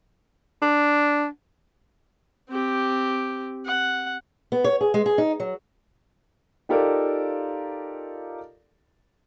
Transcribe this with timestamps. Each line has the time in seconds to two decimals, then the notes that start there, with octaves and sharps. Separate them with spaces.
0.62 D4
2.50 C4 G4
3.66 F#5
4.52 B3
4.64 C#5
4.81 G#4
4.94 G#3
5.06 G#4
5.18 D#4
5.40 F#3
6.69 D#4 F4 G4 A4 A#4 D5